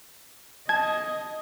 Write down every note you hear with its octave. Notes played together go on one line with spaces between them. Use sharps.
D#5 A5 G#6